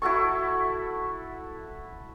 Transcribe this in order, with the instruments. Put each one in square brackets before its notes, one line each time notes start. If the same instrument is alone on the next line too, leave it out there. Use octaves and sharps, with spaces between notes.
[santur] E4 F#4 A4 C#6